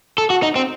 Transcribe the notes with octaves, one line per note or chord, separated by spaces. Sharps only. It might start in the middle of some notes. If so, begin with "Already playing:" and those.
A4
F#4
D#4
C4